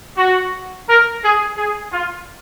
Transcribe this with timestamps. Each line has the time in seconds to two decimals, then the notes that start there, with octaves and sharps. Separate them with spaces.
0.18 F#4
0.88 A#4
1.23 G#4
1.57 G#4
1.92 F4